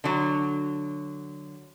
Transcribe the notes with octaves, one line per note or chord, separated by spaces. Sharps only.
D3 F#3